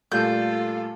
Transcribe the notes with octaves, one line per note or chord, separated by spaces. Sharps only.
A#2 G3 A3 F4 A4 G6